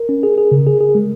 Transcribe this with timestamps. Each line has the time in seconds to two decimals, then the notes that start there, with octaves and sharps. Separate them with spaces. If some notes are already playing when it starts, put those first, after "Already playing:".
Already playing: A#4
0.09 C#4
0.23 G#4
0.38 G#4
0.52 C#3
0.67 G#4
0.81 G#4
0.95 G#3